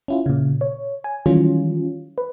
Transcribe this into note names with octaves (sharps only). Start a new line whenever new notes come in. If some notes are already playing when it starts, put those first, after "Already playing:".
C#4 E4 F4
A#2 C#3
C#5
G#5
D#3 E3 F#3 G3 C#4 F4
B4